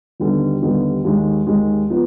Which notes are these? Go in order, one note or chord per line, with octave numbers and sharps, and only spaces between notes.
D#2 D3 G3 B3 D#4
D#2 D3 G3 B3 D#4
D#2 D#3 G#3
D#2 D#3 G#3
F3 B3